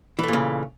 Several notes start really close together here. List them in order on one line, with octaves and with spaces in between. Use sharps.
E3 A3 A#2 C#3